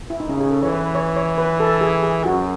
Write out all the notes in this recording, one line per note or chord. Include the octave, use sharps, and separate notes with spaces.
E4
D#4
C#3 C#4
G#4
A4
E3 C#5
B4
C#5
C#5
B4
A4
G#4
G#4
F#2 F#4